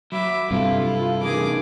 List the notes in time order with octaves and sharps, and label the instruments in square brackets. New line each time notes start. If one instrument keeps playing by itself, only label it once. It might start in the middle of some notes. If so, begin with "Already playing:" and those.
[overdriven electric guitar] F#3 [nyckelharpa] E5 D6 [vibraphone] B5
[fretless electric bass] G2 C3 [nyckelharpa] E4 A4 [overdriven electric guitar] F4
[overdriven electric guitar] E2 C#3 [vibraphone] C#4 D#4 A#4 [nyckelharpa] G#4 D6